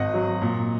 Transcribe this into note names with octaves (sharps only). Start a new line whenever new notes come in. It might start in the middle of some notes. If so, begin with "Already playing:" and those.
Already playing: G#1 D#5 F#5
F#3
A#2